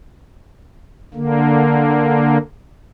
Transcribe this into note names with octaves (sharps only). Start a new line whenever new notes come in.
D3 A#3